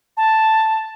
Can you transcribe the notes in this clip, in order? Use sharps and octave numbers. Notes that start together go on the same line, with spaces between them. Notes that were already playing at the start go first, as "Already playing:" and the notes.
A5